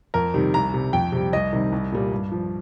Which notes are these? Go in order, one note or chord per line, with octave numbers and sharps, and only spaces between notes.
F2 A#4
C3 D#3 G3
C2 A#5
C3 G3
F2 G5
C3 G3
C2 D#5
C3 D#3 G3
C2
A#2 G3
G2
F3